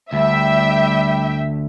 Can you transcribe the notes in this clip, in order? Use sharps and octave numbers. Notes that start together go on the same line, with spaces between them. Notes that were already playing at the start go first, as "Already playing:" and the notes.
D2 G3 E5 G5